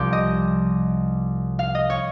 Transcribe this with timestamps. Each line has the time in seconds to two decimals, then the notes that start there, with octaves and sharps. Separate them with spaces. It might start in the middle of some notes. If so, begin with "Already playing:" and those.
Already playing: C2 C3 F3 G4
0.13 D#5
1.59 F5
1.75 D#5
1.90 C#5